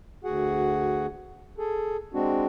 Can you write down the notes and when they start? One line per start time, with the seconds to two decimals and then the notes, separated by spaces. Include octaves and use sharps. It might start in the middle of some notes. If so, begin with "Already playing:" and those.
0.24 D2 F#4 G#4 F#5
1.58 G#4 A4
2.14 G#3 C4 D4 F#4